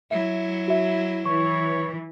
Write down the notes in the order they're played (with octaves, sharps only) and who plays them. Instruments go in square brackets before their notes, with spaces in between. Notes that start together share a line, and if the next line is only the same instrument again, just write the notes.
[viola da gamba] F#3 E4 [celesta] E5
[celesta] F#4 E5
[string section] E3 [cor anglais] C#5 [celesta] C#6